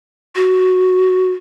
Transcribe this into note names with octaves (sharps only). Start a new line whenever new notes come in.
F#4